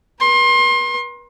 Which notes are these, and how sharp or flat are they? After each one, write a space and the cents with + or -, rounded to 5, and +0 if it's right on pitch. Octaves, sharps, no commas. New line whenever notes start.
B4 -40 C6 +30